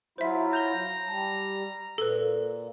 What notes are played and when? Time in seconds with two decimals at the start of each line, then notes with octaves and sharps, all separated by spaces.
0.18 F#3 E4 F4 C5 E5
0.53 A#5 G6 F7 G7
1.08 G3 A5
1.98 A#2 A4 B4